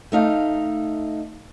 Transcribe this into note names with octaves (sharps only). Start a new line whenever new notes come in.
A3 D#4 F5